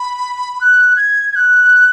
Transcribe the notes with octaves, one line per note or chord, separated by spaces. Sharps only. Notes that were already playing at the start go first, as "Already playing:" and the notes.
Already playing: B5
F#6
G#6
G#6
F#6